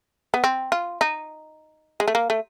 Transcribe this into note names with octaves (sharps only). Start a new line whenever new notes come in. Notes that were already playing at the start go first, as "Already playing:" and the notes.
B3
C4
F4
D#4
G#3
A3
A#3
A3